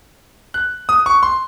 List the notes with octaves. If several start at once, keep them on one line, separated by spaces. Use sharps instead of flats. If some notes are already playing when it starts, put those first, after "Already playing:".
F#6
D#6
C#6
C6